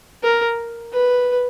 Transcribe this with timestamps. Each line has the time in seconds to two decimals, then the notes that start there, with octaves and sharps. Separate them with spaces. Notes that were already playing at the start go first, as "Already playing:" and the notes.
0.23 A#4
0.93 B4